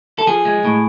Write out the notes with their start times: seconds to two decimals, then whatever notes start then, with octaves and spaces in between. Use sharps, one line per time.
0.19 A4
0.27 F3 G#4
0.45 G#3
0.65 A2